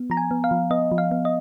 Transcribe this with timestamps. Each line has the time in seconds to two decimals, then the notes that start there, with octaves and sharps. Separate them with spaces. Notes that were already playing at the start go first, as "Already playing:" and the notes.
Already playing: B3
0.10 F3 A#5
0.17 G#5
0.31 B3
0.44 F5
0.51 F3
0.71 B3 D#5
0.92 F3
0.98 F5
1.11 B3
1.25 D#5